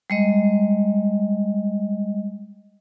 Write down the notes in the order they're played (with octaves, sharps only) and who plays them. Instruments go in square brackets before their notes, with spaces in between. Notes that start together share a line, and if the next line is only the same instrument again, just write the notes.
[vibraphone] G3 G#3 D#5